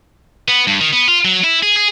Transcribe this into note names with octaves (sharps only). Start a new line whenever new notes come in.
B3
G2
D#3
B3
F4
F#3
E4
G#4
G#4